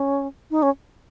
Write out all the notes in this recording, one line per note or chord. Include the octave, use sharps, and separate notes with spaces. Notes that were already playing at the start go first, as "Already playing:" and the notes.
Already playing: C#4
D#4
C#4